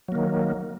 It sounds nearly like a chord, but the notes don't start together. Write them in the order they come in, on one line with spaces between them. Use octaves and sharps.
F#3 A#3 D#3